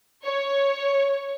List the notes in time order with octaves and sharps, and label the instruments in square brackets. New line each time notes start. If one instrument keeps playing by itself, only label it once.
[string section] C#5